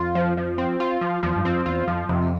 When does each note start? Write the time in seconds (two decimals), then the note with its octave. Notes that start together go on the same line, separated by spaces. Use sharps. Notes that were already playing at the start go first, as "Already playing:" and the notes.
Already playing: F2 F4
0.15 F3
0.37 F3
0.58 C4
0.80 F4
1.01 F3
1.23 E2 F3
1.36 G2
1.45 F2 C4
1.66 E2 F4
1.88 F2 F3
2.09 F2 C3